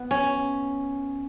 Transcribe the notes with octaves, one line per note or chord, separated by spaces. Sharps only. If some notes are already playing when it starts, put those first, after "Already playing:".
Already playing: B3
C#4